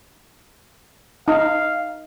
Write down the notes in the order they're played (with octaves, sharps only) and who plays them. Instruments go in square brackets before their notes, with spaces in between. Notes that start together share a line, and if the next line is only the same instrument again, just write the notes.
[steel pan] D#4 [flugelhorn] F5